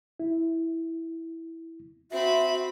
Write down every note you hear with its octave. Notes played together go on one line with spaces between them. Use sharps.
E4
C4 F#4 E5 B5